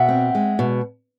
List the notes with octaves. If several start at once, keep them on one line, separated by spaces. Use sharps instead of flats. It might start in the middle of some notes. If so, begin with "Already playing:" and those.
Already playing: B2 E5 F#5
C4
G#3
B2